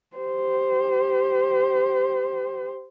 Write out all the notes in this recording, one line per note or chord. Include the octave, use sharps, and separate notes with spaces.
G4 C5